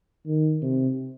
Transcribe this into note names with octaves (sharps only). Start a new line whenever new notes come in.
D#3
C3